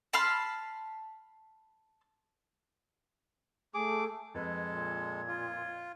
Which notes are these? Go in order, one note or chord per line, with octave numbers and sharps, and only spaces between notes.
A5 B5 C6 F6
A3 G#4 D6
F2 G#3 A4 B4 G#6
A#2
F4